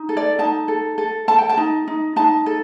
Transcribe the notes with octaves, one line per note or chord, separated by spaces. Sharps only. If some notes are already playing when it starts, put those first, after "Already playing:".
Already playing: D#4
A4
D5
D#4 A5
A4
A4
A4 A5
G5
A5
D#4
D#4
D#4 A5
A4